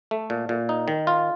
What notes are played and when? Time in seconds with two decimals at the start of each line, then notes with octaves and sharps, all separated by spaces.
0.11 A3
0.30 A#2
0.49 A#2
0.69 D#4
0.88 D#3
1.07 F4